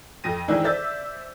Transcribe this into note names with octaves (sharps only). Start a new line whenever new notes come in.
F2 A#6 D#7
D#3 E3 G#3 C4 D4 E4
C5 D5 E5 E6 G6 A6